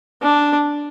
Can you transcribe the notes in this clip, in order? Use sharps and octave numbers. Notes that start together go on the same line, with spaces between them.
D4